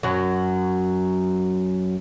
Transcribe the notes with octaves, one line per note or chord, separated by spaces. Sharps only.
F#2 F#3